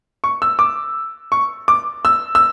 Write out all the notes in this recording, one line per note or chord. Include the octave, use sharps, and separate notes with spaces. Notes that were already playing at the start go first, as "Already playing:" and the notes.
C#6
E6
D6
C#6
D6
E6
E6